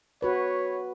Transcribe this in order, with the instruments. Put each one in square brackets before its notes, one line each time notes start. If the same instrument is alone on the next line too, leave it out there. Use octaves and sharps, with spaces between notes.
[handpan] F#4 B4 [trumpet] C#5